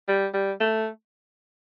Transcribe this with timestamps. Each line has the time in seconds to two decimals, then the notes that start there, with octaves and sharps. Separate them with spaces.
0.08 G3
0.34 G3
0.60 A3